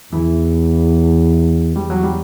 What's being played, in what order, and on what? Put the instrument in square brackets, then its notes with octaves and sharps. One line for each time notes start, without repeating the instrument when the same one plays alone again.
[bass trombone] E2 [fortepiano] E3
[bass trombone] E2 [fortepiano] G3
[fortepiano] F#3
G3